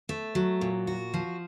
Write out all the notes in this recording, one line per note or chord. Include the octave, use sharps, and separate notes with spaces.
A3
F#3
A#2
F#4
F3